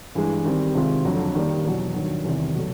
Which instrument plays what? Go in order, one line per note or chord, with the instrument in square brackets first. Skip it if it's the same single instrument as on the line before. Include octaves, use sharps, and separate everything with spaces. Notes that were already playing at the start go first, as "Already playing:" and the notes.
[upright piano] G2 E3 G#3
D#3 G3 C4
C3 D#3 G#3 C4 F4
F2 D3 F#3 A3
D#3 G3 A#3 D4
E2 B2 F#3
G2 D#3 F#3
E2 C3 D#3 G3
B2 F#3 A3